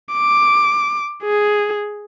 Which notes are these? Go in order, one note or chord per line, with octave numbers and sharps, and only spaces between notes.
D6
G#4